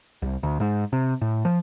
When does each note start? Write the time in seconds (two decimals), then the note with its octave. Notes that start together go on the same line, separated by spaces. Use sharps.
0.22 C2
0.43 D2
0.60 G#2
0.93 C3
1.21 A2
1.45 F3